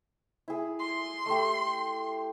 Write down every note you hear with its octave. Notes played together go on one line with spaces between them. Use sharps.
E4 G#4
C6
A3 G4